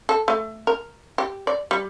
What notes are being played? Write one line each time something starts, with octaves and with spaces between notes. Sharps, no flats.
A4
A3
A#4
G4
D5
G3